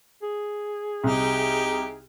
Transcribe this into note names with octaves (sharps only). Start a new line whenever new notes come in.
G#4
C2 D#4 G4